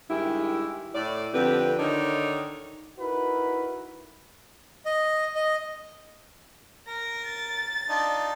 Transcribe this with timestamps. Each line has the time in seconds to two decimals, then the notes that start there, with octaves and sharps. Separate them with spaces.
0.10 G2 D#3 G#3 E4 G4
0.95 A2 D5
1.34 F2 D3 C4 G4 B4
1.79 D3 D#3 D#4 C#5 D5
2.98 D#4 E4 F#4 A#4 B4
4.86 D#5
5.35 D#5
6.88 A#4 A#6
7.27 A6
7.89 D4 D#4 F4